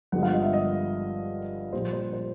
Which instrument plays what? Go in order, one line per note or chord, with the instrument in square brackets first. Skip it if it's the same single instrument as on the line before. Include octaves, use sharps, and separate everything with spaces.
[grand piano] G1 G2 D3 F3 G#3 F#5
F5
D#5
E5
D#5
A#1 A#2 G3 C5
C5
C5